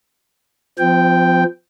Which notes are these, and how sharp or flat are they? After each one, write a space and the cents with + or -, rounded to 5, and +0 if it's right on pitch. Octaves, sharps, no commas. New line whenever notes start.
F3 +0 C4 -40 G5 +0